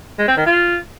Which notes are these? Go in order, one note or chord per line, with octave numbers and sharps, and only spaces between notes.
G#3
C4
D#3
F4